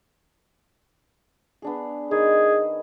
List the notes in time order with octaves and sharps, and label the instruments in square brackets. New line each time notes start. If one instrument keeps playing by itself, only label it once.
[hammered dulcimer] B3 D4 G#4
[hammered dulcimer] D#3 [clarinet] G#4